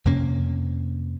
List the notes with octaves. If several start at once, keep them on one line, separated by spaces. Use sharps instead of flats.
F2 C3 A#3 C#4